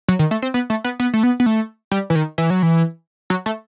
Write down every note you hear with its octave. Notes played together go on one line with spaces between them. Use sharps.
F#3
D#3
A3
C4
B3
A3
B3
B3
A3
B3
B3
A3
G3
E3
D#3
E3
F#3
E3
F#3
A3